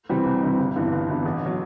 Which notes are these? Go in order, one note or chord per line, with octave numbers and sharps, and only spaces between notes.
C3 E3 G3 C4
C2
C3 E3 G3 C4
G1
G2 E3 B3
G1
G2 E3 B3
A1
F#3